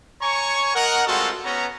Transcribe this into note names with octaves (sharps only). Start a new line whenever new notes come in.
C#5 G#5 A#5 C#6
A#4 D#5 F#5
G3 G#3 C4 F4 F#4 A4
B3 C#4 A#5